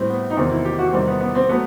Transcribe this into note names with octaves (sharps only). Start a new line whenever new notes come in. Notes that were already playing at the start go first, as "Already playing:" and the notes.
Already playing: A2 G3 C4
B3
D#4
E2 C3 D#3 C4
E4
G4
F#4
E2 C3 D#3 G3 C4
B3
B3
C4
F#3 A3 B3